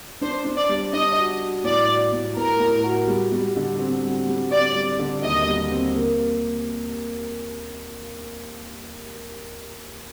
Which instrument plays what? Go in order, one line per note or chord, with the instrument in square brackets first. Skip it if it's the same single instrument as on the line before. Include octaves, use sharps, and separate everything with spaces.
[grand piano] D4 [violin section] C5
[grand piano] D4
[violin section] D5
[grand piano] G3
[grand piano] D4 [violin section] D#5
[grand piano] F#4
F#4
[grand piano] A2 [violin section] D5
[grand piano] F#4
A2
[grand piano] A2 [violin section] A#4
[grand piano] A2
F#4
G3
G3
D3
C4
G3
G3
[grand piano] C4 [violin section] D5
[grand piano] G3
D3
[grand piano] D#2 [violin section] D#5
[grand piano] G3
C4
A#3